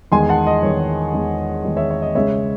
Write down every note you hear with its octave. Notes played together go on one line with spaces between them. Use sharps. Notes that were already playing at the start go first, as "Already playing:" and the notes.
E2 D#3 G#3 G#5 C6
F#5 A5
D#5
E2 D#3 G#3 C#5
E2 D#3 G#3
E2 D#3 G#3
C#5 E5
C#5
D#5
C#2 C#3 G#3 C#5 E5